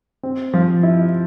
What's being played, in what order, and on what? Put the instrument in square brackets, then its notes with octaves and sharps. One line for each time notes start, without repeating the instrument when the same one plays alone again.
[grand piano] C4
F3
E4